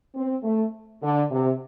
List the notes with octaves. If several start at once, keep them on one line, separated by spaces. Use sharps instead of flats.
C4
A3
D3
C3